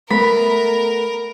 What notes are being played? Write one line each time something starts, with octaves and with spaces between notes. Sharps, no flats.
A3 B3 A#4 B5